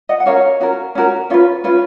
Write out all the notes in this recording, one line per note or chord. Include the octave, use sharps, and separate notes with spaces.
D#5 F#5
F#5
C#4 F#4 A#4 C#5 F5
C#4 F#4 A#4
C#4 F#4 A#4
C#4 F4 B4
C#4 F4 B4